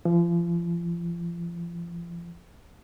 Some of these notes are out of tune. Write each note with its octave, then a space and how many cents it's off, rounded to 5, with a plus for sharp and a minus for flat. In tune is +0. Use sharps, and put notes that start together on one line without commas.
F3 -35